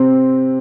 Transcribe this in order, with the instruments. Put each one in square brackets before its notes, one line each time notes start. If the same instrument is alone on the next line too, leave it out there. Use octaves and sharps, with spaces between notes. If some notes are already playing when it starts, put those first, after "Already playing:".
Already playing: [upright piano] C3 C4